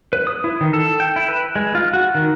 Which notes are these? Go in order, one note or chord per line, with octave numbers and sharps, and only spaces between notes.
B4
D#6
E4
D#3
A4
G5
E4
B4
G#3
F4
F#4
D#3